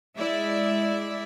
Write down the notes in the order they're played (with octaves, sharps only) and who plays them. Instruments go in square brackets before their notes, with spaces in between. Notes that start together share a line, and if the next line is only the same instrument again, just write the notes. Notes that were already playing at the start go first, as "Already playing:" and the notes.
[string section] G#3 E4 D5 E5